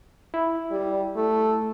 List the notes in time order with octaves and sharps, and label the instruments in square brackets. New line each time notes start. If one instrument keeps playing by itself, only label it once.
[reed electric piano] E4
[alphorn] G3
A3